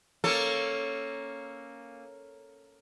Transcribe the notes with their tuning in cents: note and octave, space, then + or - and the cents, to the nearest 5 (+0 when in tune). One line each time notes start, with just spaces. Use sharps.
A#3 +0 C#4 +0 A4 +5